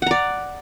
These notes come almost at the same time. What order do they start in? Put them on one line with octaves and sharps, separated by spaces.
F#5 A#5 D5